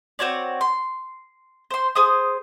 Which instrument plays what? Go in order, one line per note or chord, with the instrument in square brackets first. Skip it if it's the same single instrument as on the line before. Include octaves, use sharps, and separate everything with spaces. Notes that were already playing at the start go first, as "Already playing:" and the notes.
[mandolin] C4 F#4 C#5 D5
C6
C5 C6
G#4 C5 D#6